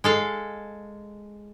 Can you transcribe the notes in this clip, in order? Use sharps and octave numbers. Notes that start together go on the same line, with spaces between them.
G#3 A4 F5